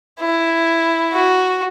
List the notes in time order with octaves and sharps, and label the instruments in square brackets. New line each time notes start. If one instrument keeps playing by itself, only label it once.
[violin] E4
F#4